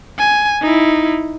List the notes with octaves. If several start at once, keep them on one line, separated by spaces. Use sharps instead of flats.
G#5
D#4 E4